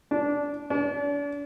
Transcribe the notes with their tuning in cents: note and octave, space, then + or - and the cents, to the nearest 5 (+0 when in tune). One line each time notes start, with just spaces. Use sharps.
D4 -15
D4 -40